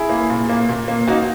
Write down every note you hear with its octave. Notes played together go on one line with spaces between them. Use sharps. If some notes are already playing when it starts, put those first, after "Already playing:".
Already playing: E4 G#4
A#3
A#2
A#3
A#2
A#3
A#3 D#4 F#4